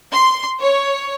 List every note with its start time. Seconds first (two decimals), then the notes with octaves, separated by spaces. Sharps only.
0.12 C6
0.62 C#5